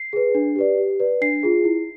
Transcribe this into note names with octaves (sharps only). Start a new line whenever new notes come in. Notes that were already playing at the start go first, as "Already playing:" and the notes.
Already playing: C7
G#4 B4
D4
G4 B4 D5
G4
B4 D5
D4 C7
F4 G#4
E4